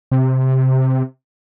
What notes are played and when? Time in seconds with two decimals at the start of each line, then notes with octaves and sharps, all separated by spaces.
0.12 C3